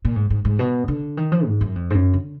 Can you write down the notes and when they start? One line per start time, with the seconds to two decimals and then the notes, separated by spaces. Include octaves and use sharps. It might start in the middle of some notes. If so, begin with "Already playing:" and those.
0.05 A#2
0.16 G#2
0.30 G#2
0.45 G#2
0.59 B2
0.88 D3
1.17 D#3
1.32 F3
1.46 G#2
1.61 F#2
1.75 F2
1.90 G#2
1.95 F#2
2.14 D3